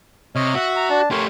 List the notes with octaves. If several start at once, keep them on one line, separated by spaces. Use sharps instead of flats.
C3 C#5 D#5 F6
F#4 E5
A#5
D4 A5
A3 G4 A#4 C#5 C6